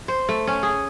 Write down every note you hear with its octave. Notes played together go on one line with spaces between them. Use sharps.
C5
A3
C#4
G#4